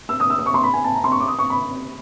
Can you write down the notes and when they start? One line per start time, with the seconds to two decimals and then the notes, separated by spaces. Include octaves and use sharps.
0.09 E6
0.20 D#6
0.30 E6
0.38 D#6
0.46 C#6
0.54 C6
0.63 B5
0.74 G#5
0.84 A5
0.95 A#5
1.04 C6
1.12 C#6
1.20 D6
1.28 D#6
1.39 C#6
1.50 B5